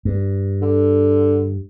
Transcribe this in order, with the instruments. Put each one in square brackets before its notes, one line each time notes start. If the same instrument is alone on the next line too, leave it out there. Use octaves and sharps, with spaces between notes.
[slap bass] G2
[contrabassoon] D3